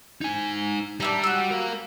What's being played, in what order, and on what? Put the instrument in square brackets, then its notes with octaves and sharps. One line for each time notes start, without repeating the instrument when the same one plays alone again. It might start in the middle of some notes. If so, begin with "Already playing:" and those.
[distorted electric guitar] D#4 G#5
[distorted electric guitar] G3 [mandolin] D4 E4 A#5
[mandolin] F#4 E6
[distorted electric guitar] A#4 F5